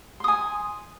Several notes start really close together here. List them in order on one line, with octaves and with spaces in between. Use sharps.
C6 D#6 G#5